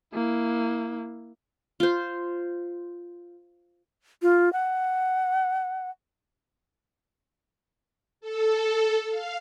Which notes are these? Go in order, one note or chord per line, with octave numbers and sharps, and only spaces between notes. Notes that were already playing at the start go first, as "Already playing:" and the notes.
A#3 E4
F4 C5
F4
F#5
A4
F5